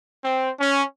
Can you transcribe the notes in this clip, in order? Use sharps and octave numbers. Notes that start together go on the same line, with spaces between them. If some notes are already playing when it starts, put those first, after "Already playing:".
C4
C#4